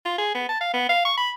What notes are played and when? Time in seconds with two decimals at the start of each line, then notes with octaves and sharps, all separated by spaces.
0.05 F4
0.18 G#4
0.34 B3
0.49 A5
0.61 F5
0.74 B3
0.89 F5
1.05 C#6
1.17 B5